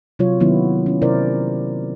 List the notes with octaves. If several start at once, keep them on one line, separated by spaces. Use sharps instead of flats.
C3 F#3 F4 C#5
D#3 F#3 A#3 B3 C#4 E4
C#4 E4
C3 C#4 E4 A#4 C5 D5